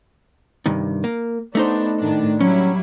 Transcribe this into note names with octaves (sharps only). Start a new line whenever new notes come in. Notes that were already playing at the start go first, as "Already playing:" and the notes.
G2 C3 D#3
A#3
A3 B3 D4 D#4 C5
A2 D#3 D4
F#3 G3 C#4 E4